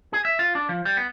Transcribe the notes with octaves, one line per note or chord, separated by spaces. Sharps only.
G#4
E5
F4
D4
F3
G3
B3